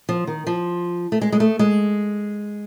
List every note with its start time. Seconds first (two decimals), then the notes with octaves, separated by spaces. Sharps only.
0.09 F3
0.27 D#3
0.47 F3
1.12 A3
1.22 G#3
1.32 G#3
1.40 A3
1.59 G#3